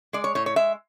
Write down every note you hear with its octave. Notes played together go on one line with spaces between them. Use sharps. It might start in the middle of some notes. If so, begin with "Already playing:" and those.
G#3 D5
C#5
A2 C#5
C#5
G#3 E5